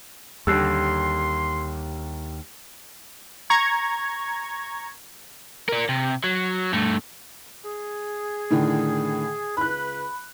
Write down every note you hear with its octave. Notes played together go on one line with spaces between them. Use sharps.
D#2 D3 G3 C6 E6 F#6 C7
A#5 C#6 G#6
A#4 D5
C3
F#3
G2 A3
G#4
A2 D3 D#3
C#2 C#3 B4 B5 F#6